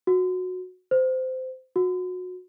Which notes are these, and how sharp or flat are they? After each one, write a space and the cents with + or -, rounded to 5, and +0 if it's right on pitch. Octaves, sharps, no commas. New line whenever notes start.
F#4 -15
C5 -20
F#4 -25